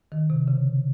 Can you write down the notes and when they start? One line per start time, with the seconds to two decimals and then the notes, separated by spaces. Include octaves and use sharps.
0.12 D#3
0.30 C3
0.48 C#3